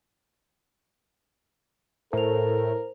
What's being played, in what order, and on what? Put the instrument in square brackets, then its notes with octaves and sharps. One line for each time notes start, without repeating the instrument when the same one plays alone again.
[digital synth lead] A2 [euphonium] A4 [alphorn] A#4 [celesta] C5 F7